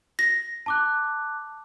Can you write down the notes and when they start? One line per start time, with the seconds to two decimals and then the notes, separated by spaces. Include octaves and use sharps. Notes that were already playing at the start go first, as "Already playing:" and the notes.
0.19 A#6
0.66 A5 D6 F#6